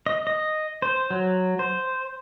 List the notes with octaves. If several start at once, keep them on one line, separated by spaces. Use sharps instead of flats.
D#5
D#5
C5
F#3
C5